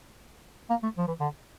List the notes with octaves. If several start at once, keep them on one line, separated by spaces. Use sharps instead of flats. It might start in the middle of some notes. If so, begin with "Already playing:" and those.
A#3
A3
F3
E3
D3